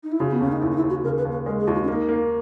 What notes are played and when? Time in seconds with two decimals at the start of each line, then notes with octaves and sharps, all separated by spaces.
0.03 D#4
0.12 E4
0.20 C#3 F#4
0.31 B3
0.40 D#2 C#4
0.52 D#4
0.62 D#2 E4
0.71 D#4
0.76 E4
0.82 D#2
0.90 F#4
1.04 C#3 A#4
1.18 B4
1.25 D#2
1.31 B4
1.46 G#3 A#4
1.59 G#4
1.67 D#2 E4
1.74 F#4
1.83 C#4
1.88 A#3 D#4
2.09 A#3